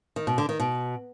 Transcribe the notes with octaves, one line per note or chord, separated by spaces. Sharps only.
D#3
B2
D3
D#3
B2